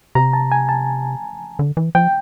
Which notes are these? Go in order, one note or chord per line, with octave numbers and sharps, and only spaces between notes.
C3 A#5
A5
G#5
A5
D3
E3
F3 G5